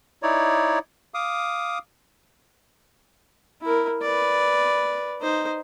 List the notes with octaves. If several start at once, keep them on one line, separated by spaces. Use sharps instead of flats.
D#4 E4 C#5 D5
F5 D6 D#6
E4 A#4
B4 D5
D#4 C5